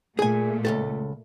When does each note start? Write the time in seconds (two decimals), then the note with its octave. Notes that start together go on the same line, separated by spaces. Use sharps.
0.19 A#2 A3 G#4 G#5
0.65 C#2 G2 A4